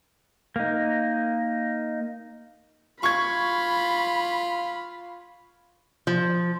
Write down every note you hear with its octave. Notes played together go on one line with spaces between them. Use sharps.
A#3 D#4
F4 B5 C#6 G#6
F3